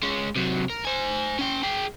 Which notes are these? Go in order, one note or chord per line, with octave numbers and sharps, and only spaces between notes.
G#3 C#4
C3 F#3
A#4
C5 G#5
C#4 G5
G#4 G5